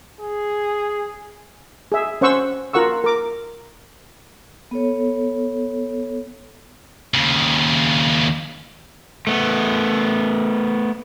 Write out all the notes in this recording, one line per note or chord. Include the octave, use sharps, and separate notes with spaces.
G#4
G#4 E5
C#4 C5 F#5 C#6 E6
F4 A#4 F#5 C#6 E6
A#4 D6
B3 A4 C#5
D#2 C#3
A3 B3